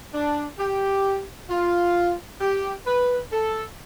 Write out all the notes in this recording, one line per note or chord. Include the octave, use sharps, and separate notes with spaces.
D4
G4
F4
G4
B4
A4